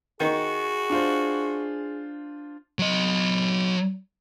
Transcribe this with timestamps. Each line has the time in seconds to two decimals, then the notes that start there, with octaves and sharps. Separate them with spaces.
0.20 D#3 F#4 G#4
0.90 D4 F4 C5
2.79 F#3 D#5